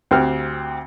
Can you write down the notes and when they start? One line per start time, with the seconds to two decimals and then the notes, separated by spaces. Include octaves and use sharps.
0.11 D2 C4 G4 F6